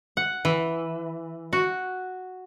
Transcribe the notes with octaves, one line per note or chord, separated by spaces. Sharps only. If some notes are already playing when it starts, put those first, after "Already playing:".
F#5
E3
F#4